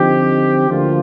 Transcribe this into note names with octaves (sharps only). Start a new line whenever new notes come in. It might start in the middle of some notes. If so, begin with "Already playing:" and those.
Already playing: D3 F3 C4 D#4 G4
D2 D3 F3 A#3 F4